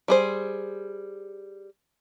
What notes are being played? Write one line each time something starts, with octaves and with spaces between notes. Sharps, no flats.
G3 G#4 C5